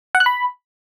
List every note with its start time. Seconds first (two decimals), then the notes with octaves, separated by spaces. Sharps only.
0.15 F#5
0.20 F#6
0.26 B5